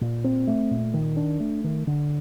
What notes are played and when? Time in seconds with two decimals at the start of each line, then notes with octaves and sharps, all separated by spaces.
0.01 A#2
0.24 C4
0.47 A3
0.71 A#2
0.94 D#3
1.16 D4
1.40 A3
1.64 D#3
1.87 D3